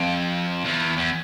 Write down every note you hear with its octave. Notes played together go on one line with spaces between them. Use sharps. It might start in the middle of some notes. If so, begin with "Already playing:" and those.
Already playing: F2
E2
E2